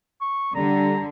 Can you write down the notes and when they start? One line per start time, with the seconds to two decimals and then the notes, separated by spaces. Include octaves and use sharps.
0.21 C#6
0.55 D3 G3 A#5